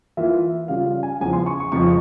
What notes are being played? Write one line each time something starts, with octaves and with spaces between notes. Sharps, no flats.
E3 A#3 F4 E5
C#3 G3 C#4 F4 F5
F5
G#5
E2 C#3 F3 G#5
C6
C#6
C#6
F2 C#3 F3 G#3 C#6